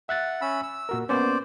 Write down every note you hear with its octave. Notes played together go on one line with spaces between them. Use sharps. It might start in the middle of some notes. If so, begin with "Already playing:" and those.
E5 F#5 F#6 A6
C#4 B5 E6
E6
A#2 F#4 A#4
A#3 B3 C#4 C5 D5